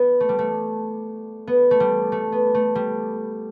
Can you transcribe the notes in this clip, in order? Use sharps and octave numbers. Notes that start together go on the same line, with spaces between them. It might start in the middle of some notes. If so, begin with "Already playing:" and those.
Already playing: B3
A3
G3
A3
B3
A3
G3
A3
B3
A3
G3